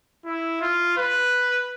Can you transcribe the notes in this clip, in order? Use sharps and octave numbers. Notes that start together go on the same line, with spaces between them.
E4
F4
B4